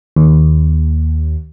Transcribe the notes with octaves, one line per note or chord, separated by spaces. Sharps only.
D#2